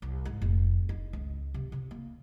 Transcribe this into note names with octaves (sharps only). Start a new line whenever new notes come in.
C2
G#2
F1
D#4
C#2
C3
C3
A#3